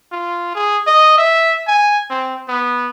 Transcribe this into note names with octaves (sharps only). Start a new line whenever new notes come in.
F4
G#4
D#5
E5
G#5
C4
B3